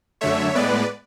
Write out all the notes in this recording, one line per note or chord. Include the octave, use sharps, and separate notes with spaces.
F#2 D3 A3 C#5 E5
A2 G#3 B3 B4 D5